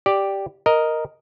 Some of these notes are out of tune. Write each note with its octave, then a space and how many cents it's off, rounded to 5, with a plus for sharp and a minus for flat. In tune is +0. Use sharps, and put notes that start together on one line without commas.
G4 +0 D5 +0
A#4 +0 D#5 +0